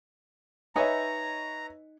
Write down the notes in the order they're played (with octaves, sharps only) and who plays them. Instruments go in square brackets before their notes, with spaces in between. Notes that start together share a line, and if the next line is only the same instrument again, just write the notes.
[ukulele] D#4 D#5 G#5 [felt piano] B4 C#5 E5 [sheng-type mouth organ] A#5